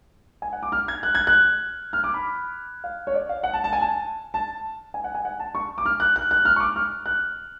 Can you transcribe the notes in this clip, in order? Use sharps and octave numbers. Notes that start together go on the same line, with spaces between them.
G#5
F#5
D6
F6
G#6
F#6
G#6
F#6
F6
D6
B5
F5
C#5
D5
F5
F#5
A5
A5
G#5
A5
A5
G#5
F#5
G#5
F#5
A5
C#6
D6
F6
F#6
F#6
F#6
F6
C#6
D6
F6
F#6